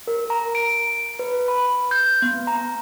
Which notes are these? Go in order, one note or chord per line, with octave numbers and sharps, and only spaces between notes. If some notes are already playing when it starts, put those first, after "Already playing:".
A#4
A#5
D7
B4
B5
G6
B3
A#5